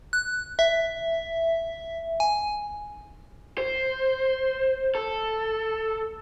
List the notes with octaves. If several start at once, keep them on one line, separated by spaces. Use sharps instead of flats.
F#6
E5
G#5
C5
A4